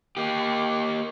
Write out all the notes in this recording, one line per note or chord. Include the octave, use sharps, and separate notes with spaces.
A#3 G4